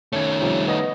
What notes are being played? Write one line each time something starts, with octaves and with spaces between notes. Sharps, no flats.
D#3 A3 C#4 A5 G#6
C3 F3 G3
B3 C#5 D#5 A#6